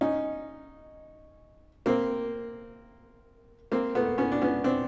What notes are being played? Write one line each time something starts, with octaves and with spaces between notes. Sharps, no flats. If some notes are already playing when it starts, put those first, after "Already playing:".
C#4 D#4
A#3 C4
A#3 C4
A3 B3
B3 C#4
D4
B3 C#4
C4 D4